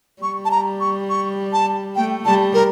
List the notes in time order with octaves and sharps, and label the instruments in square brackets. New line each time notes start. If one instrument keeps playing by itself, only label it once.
[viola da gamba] G3 [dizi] C#6
[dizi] A5
A#5
C#6
C#6
A5
[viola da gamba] A3 [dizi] G5
[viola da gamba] G3 [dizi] A5
[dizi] A#4